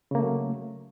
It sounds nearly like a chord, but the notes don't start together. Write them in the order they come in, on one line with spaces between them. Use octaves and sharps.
C#3 A#3 A3 F#3